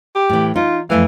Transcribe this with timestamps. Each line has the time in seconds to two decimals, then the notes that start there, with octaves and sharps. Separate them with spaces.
0.15 G4
0.29 A2 E3
0.56 D#4 F4
0.90 F2 E3 A3 F5